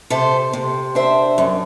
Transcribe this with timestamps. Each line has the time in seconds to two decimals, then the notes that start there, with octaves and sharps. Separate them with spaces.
0.10 C3 A4 C5
0.53 C3
0.95 D4 C5 E5
1.38 F#2